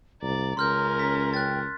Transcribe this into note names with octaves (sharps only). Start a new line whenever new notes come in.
C2 D5 A#5
C#2 C#4 A#4 C6 F6 G6
B6
G5 F#6 A6